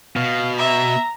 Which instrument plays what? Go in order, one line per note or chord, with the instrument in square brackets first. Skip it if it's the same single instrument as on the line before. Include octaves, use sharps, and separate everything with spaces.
[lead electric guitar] B2 [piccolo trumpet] F5
[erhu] E5 [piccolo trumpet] A#5